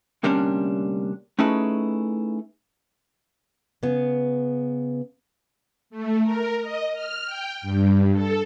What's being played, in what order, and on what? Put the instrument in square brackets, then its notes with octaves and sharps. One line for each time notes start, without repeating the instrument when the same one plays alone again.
[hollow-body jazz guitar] D2 C3 G3 A#3 C#4 D4
A3 C#4 D#4 E4 G#4 B4
[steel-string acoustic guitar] C#3 B3
[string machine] A3
A#4
D#5
F6
G5
G2
A4